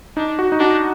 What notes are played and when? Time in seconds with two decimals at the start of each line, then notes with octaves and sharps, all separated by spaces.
0.17 D4 D#4
0.39 F#4
0.52 D#4
0.60 D4 F#4